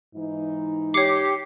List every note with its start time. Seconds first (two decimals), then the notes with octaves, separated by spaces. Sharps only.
0.15 G#2 E3 D#4
0.94 G4 C#5 D6 C7 C#7